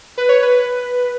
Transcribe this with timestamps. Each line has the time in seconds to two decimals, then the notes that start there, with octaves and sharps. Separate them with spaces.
0.18 B4
0.29 C#5
0.42 B4